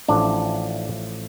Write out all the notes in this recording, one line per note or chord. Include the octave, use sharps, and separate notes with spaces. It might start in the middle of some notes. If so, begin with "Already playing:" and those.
A1 A2 F3 D4